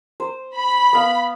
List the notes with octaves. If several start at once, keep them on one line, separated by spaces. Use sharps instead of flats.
C5
B5
B3 F5